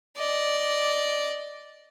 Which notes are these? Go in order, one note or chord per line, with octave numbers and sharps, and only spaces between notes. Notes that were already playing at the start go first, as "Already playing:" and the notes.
D5 D#5